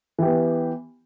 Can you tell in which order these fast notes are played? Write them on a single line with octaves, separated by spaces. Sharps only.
E3 G4 B3